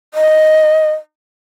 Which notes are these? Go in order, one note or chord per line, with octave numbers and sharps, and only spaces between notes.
D#5